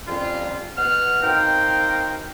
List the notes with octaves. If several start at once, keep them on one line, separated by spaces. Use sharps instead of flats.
F2 G3 C#4 F4
B2 B3 F#5 F6
C4 D#4 F#4 A#4 F5 G5